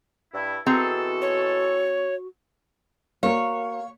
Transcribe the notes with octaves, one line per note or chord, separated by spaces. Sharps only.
G2 E4
B2 E3 C4 F#4 G#4 A4 A#5
C#5
A#3 F#4 A#4 C#5 F5